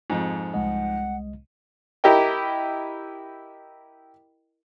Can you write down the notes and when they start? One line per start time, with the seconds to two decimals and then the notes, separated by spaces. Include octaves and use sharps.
0.10 F2 G#2
0.54 C2 G#3 D#5 F#5
2.04 E4 G4 A#4 D#5 G5